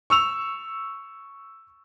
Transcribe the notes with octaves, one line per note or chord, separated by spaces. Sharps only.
C#6 E6 F7